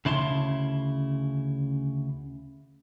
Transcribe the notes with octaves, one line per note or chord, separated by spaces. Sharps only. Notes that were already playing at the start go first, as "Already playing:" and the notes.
D2 C#3 E4 A5 C6